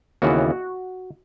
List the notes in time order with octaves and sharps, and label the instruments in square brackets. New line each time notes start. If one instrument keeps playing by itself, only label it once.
[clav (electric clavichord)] D#2 C#3 E3 B3 E4 F#4